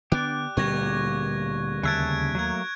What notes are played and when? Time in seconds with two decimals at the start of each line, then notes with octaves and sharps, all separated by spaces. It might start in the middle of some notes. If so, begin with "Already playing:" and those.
0.12 D3 B3 D4 G4 D5 F#6
0.57 D2 A#2 G3 B3 C#6 G#6 A#6
1.83 D#2 C#3 E5 A5 F#6 G#6 D7
2.35 F#3 A3 A#3 F#6 G#6